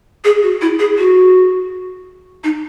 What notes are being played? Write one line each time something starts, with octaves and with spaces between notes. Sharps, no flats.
G#4
F#4
E4
G#4
F#4
D#4